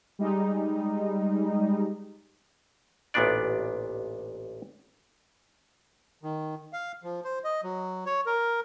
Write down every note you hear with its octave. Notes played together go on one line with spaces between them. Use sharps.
G3 G#3 D#4
A1 D2 A#2 B3 D4 D5
D#3
F5
F3
C5
D#5
F#3
C#5
A#4